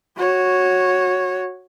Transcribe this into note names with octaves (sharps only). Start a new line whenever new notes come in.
F#4 C#5